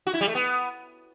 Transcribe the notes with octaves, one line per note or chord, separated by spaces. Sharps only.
F#4
E4
G3
A3
B3